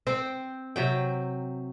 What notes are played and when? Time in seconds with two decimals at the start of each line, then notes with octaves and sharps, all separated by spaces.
0.07 C4 C5 G5
0.76 C3 F#3 G5